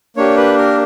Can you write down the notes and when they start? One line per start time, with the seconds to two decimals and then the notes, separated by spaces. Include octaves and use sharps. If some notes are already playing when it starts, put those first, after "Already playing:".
0.17 A#3 D4 G4 C#5
0.37 B4
0.58 A#4